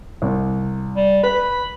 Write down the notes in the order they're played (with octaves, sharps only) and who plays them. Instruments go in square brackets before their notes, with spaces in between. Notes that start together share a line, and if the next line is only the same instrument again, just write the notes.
[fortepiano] C2
[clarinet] G3
[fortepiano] B4 [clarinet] B5